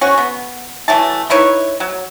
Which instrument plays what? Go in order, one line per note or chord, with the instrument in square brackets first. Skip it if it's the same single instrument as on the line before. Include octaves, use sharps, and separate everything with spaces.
[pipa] C#4 F#4
B3
E3 F#3 A3 A5
D#4 E4 B4 C#5
F#3